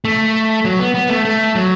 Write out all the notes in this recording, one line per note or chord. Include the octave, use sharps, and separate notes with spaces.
A3
F#3
B3
B3
A3
A3
F#3